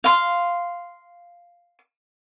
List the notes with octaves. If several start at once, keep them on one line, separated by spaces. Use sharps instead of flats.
F5 C6